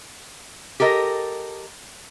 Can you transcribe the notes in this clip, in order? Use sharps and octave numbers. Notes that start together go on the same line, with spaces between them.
G4 A4 A#4 D#5